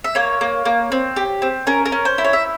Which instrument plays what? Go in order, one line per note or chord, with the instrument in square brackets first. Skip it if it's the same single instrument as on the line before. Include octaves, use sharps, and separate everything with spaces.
[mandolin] E5
A#3 C#5
A#3
A#3
C4
G4
C4
C#4 A#4
A#4
C#4
C5
E4
C#5
E5